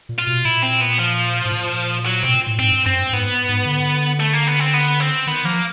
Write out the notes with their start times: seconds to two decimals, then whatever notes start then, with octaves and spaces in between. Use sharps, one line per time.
0.09 A#2
0.18 F4
0.27 B2
0.45 A#2 E4
0.62 C4
0.80 B3
0.98 F3
1.45 A2
1.52 A#2
2.06 F#3
2.23 B2 C4
2.35 A#2
2.47 A2
2.59 G#2 C4
2.72 G2
2.86 F#2 C4
2.99 G2
3.13 G#2 B3
3.49 G#2
3.66 D3
4.20 A3
4.33 A#3
4.47 B3
4.60 C4
4.74 B3
5.00 C4
5.27 D#3 B3
5.44 F3 A#3